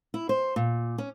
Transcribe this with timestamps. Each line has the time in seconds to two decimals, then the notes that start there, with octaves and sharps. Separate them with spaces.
0.14 E4
0.29 C5
0.56 A#2
0.98 C#4